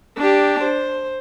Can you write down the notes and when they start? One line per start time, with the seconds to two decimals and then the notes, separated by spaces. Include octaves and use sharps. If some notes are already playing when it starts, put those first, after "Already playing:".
0.18 D4 G4
0.64 C5